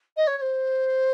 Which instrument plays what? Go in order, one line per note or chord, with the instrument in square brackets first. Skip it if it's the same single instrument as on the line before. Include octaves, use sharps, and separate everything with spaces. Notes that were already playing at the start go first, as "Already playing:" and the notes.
[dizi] D#5
C#5
C#5
C5